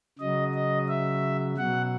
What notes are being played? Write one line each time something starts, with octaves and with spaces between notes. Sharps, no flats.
C#3 F#3 D#5
D#5
E5
B2 F#3 F#5